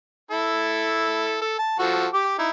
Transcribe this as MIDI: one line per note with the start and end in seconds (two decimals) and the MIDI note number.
0.31 1.41 64
0.31 1.41 69
1.42 1.57 69
1.58 1.77 81
1.79 2.07 53
1.79 2.07 66
1.79 2.07 69
2.14 2.35 67
2.14 2.35 86
2.39 2.50 63
2.39 2.50 64